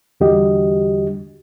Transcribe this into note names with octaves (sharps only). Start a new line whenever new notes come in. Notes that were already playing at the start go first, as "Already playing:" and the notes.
E2 D3 G3 F#4 G4 D#5